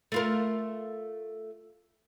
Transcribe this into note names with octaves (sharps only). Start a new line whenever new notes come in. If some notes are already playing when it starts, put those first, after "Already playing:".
A3 F4 A#4